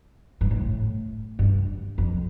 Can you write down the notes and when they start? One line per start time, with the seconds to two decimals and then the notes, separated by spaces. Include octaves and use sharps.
0.41 G2
0.51 A2
1.39 G2
1.98 F2